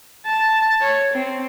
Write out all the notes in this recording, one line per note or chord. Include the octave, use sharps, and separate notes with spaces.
A5
C#5
C4